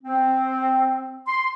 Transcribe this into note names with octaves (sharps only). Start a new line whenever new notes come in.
C4
C6